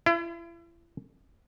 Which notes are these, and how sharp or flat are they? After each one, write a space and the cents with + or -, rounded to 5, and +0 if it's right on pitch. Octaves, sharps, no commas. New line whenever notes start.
E4 +40